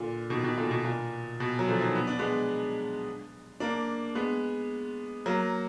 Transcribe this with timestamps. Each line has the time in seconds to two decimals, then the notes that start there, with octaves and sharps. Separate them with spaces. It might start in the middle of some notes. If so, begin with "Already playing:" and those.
Already playing: A#2 D3
0.30 B2 D#3
0.44 B2 D#3
0.57 A#2 D3
0.71 B2
0.85 A#2
1.40 B2
1.59 F#3
1.68 D3 F3
1.81 D#3 F#3
1.95 B3
2.07 D4
2.19 G#3 B3
3.60 A#3 D4
4.15 G#3 B3
5.26 F#3 A#3